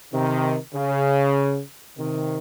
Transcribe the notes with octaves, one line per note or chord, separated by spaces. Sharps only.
C3 D#3
C#3
C3 D#3